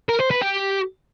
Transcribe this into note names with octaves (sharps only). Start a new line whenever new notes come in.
A#4
C5
B4
G4